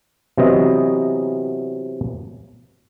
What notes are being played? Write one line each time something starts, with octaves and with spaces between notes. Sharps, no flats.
C3 E3 F#3 B3 D#5